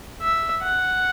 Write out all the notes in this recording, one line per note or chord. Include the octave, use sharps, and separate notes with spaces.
E5
F#5